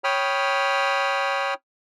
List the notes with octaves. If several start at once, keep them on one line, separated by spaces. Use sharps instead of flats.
C#5 G5 B5 D#6 F6